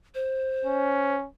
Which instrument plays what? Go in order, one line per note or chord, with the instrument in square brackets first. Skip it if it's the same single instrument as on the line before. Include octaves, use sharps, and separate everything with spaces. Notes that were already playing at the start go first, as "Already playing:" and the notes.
[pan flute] C5
[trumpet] C#4